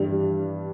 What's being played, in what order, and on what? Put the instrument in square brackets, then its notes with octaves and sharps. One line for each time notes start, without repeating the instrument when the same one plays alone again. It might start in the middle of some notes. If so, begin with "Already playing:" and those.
Already playing: [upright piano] G2 E3 G3 D4